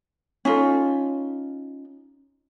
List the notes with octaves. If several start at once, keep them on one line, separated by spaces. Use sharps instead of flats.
C#4 D#4 F4 A4